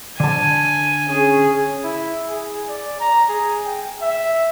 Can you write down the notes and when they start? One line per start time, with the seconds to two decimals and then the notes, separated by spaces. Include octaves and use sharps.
0.20 D3 G#5 A5
1.08 C#4 G#4
1.84 E4
2.29 G#4
2.69 D5
3.00 A#5
3.29 G#4
3.66 G5
4.02 E5